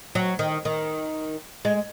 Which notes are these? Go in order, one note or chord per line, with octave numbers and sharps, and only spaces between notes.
F#3
D#3
D#3
G#3